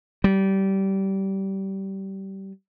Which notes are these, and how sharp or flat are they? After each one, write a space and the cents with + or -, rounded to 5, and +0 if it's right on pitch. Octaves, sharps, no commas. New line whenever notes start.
G3 -20